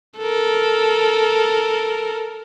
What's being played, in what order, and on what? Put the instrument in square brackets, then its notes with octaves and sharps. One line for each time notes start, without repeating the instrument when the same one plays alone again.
[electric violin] A4 A#4